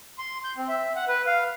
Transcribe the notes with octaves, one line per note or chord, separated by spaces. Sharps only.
C6
G6
C4
E5
F#5
B4
F5